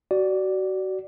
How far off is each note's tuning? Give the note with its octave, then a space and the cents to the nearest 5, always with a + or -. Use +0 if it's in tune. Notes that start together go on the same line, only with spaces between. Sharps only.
F#4 +30 D5 +0